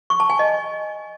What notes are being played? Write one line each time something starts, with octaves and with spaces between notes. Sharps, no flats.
C#6
A5
G#5
D#5